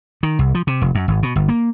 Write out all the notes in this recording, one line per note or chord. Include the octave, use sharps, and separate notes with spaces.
D#3
C2
F3
C3
F1
F#2
G#1
B2
G1
A#3